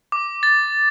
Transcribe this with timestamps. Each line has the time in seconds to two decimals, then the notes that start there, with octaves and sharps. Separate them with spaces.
0.12 D6
0.43 A6